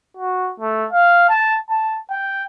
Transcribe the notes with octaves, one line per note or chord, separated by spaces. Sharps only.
F#4
A3
F5
A5
A5
G5